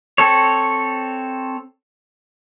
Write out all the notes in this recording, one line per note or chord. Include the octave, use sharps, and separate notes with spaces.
C4 A4 C#5